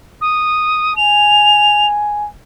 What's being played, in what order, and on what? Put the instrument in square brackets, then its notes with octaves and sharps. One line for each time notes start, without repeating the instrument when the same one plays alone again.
[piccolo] D#6
[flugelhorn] G#5 [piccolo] F7